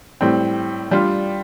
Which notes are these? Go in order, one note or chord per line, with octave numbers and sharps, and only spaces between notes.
A2 G3 C4
G3 D4 F4